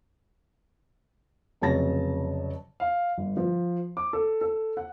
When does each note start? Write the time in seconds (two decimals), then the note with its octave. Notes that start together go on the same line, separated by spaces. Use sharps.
1.61 F1 C#3 F#3 A5 A6 A#6
2.80 F5
3.18 G1
3.37 F3
3.97 D6
4.13 A4
4.41 A4
4.77 F#5